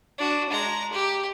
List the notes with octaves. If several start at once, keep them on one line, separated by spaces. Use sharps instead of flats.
D4 F#4
G#3 A#5
G4